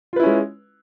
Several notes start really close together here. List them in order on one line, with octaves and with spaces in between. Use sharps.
F4 B4 E4 C#4 G#3